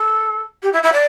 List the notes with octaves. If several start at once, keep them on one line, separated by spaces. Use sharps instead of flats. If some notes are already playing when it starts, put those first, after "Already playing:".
Already playing: A4
G4
E4
E4
D5